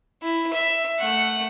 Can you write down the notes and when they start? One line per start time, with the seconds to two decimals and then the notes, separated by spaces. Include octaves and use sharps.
0.22 E4
0.53 E5
0.99 A3 F#5